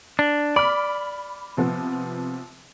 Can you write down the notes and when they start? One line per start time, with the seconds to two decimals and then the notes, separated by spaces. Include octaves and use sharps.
0.19 D4
0.56 D5 B5 F6
1.57 C3 F3 B3